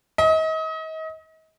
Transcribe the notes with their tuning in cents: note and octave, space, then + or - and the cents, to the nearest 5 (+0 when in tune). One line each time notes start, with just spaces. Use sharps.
D#5 +35